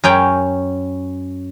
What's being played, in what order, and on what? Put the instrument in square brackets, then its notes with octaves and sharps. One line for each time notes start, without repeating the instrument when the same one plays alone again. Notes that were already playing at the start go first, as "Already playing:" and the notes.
[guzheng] F#2 C#4 G5